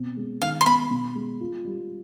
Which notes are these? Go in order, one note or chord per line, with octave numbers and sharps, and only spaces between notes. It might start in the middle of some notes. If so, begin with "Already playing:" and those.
Already playing: B2 C4
G#3
D#3 F5
C6
B3 B5
B2
G#3
F4
G3